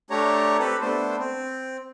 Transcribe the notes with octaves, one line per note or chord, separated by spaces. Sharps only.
A3 D4 G4 C#5 A#5
C4 G4 A4 B4
A3 B3 D4 C5
C4